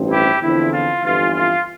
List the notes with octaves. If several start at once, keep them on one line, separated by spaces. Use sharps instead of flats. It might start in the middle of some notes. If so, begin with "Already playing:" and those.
Already playing: A1 G2 F3 C4
E4 G4
E2 D3 F3 C4 E4
F4
G1 F2 E3 F4
F4